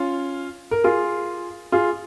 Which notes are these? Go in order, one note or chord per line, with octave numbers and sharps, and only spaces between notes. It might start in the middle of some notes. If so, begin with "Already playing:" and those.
Already playing: C#4 F4
A#4
F4 G#4
F4 G#4